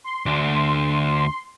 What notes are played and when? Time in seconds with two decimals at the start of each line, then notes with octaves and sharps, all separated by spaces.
0.04 C6
0.26 D2 D4